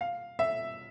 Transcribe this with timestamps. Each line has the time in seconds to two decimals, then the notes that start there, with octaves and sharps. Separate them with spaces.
0.01 F5
0.39 E5